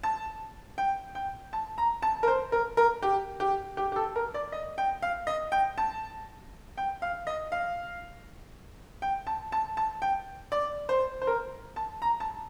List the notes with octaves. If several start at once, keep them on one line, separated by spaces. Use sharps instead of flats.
A5
G5
G5
A5
A#5
A5
A#4
C5
A#4
A#4
G4
G4
G4
G4
A4
A#4
D5
D#5
G5
F5
D#5
G5
A5
G5
F5
D#5
F5
G5
A5
A5
A5
G5
D5
C5
C5
A#4
A5
A#5
A5